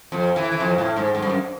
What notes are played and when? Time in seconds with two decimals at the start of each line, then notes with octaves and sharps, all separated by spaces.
0.12 F2
0.36 E3
0.52 E3
0.60 F2
0.78 A2
0.96 G#2
1.15 G#2
1.22 G2
1.30 F#2